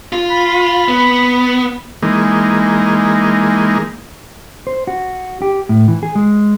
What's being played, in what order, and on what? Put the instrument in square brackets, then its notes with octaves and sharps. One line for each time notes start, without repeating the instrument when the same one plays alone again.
[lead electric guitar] F4
[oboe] B5
[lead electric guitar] B3
[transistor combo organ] E3 G#3 A#3 D#4
[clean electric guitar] C5
F#4
G4
A2
E3
G#4
G#3